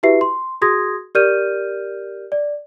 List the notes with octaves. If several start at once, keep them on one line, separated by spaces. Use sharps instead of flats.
E4 F#4 G4 B4 E5 C7
C6
F#4 G#4 C6 D#6 G#6 A#6
G4 A#4 D5 F6 G6 D#7
D5